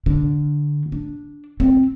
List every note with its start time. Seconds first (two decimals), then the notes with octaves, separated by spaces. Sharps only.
0.06 D3
0.92 D4
1.60 C4